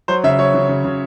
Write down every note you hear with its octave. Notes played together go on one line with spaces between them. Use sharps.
F#3 C5
C#3 E5
F#3 C#5
C#3
C#3
C#3